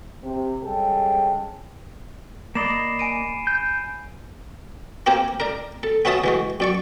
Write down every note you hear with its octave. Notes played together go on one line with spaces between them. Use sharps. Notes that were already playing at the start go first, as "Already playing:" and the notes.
C3
G3 G#3 C#4 G#4 A4 G5
A#3 D5 D#5 B5 C7 E7
G#5 D7 D#7
G6
A#3 C4 G4 A#4 G#5
D4 A#4
A4
B3 C#4 F#4 E5 A5 D#6
E3 G#3 F#4
F#2 D5 C#6